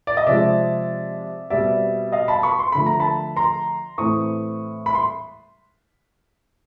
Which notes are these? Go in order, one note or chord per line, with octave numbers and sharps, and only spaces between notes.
D5
D#5
C3 F3 G#3 C4 D5 E5
B2 G3 C4 D5 E5
D#5 F5
A5 B5
B5 C#6
C6
D3 F3 A3 B5
A#5
A5 B5
A#5 C6
A2 E3 A3 C4 C#6 D#6
B5
C6